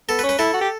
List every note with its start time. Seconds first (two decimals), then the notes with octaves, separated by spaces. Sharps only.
0.09 B3 A4
0.19 B4
0.23 C#4
0.29 B4
0.39 E4 A4
0.54 F#4
0.61 G4